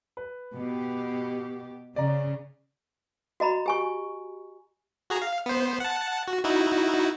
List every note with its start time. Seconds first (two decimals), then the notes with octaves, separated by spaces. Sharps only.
0.17 B4
0.54 B2 G4
1.96 C#3 D5 A#5
3.40 F#4 D#5 A#5 B5
3.66 G4 G#5 C#6
5.10 F#4 G#4 A#5
5.22 F5
5.46 B3 C5
5.80 F#5 A5
6.28 F#4
6.45 D#4 E4 F#4